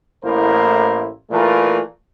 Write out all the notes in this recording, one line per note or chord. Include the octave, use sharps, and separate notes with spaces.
A1 A2 A#3 E4 A#4 C5
A#2 E3 A3 F4 A#4 B4